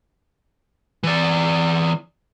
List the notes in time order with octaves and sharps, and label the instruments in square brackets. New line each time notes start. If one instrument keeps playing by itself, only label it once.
[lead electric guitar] E3 D5